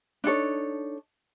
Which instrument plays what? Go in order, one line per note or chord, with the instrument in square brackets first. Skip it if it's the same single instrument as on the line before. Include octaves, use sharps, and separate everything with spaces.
[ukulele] D4 D#4 A4 C#5